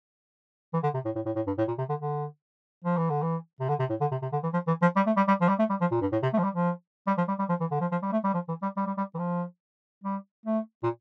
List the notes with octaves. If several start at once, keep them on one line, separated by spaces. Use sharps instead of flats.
E3
D3
C3
A2
A2
A2
A2
G2
A2
A#2
C3
D3
D3
F3
E3
D3
E3
C3
D3
C3
A2
D3
C3
C3
D3
E3
F3
E3
F3
G3
A3
G3
G3
F3
G3
A3
G3
F3
A#2
G2
A2
C3
A3
F3
G3
F3
G3
F3
G3
G3
F3
E3
D3
F3
F3
G3
A3
G3
F3
E3
G3
G3
G3
G3
E3
F3
G3
A3
A#2